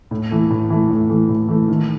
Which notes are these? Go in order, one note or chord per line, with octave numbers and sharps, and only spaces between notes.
A2
E3 A3
A2
E3 A3
A2
E3 A3
A2
E3 A3
D#3